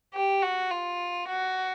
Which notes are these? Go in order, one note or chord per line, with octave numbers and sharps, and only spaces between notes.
G4
F#4
F4
F#4